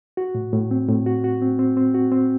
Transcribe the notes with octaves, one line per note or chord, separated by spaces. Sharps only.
F#4
A2
A2
C4
A2
F#4
F#4
C4
C4
C4
F#4
C4